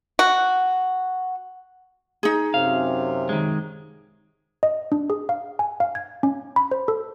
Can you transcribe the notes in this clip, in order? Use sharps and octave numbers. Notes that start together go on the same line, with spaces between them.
F#4
D#4 G#4
F#2 C3 F5
D#3 G#3
D#5
D4
G#4
F5
G#5
F5
G#6
C#4
B5
C5
A4